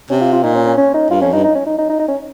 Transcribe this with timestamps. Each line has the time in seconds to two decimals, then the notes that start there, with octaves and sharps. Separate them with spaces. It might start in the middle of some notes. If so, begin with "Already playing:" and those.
0.10 C3 C#4
0.21 F4
0.33 F4
0.43 A#2 D#4
0.55 C#4
0.66 C#4
0.77 C#4
0.94 D#4
1.10 G2 F4
1.22 F2 C#4
1.33 G2 D#4
1.44 D#4
1.55 C#4
1.67 D#4
1.78 D#4
1.89 D#4
2.00 D#4
2.08 C#4